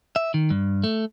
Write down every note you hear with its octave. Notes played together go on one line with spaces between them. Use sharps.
E5
D#3
G2
A3